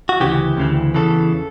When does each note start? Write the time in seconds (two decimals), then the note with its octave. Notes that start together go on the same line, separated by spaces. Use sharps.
0.09 F#4
0.20 D2 C#3 E3 G4
0.57 D2 C#3 E3
0.95 E2 C#3 E3 A4